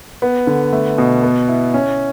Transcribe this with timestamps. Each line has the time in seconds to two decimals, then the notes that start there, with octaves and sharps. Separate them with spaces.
0.22 B3
0.47 D3
0.73 A3
0.98 B2
1.23 B3
1.48 E4
1.74 C#4